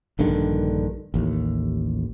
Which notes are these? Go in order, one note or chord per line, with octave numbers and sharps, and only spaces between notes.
A#1 G2 D3 D#3
A1 D#2